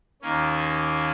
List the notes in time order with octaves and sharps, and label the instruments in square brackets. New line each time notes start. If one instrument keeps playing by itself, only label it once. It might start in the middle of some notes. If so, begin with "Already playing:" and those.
[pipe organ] D#2 D#3 A#3 C#4